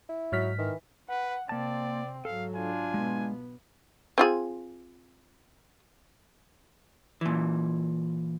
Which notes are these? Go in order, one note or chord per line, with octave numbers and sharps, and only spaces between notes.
E4
G#2 F#3 F6 B6
D#3 E3
B4 F#5
C3 A#3 C4 D5 A5
G#2 F#3 A4 F5
D4 F4 G#5
B2 G#3 B3
C4 F4 G#4
A#2 E3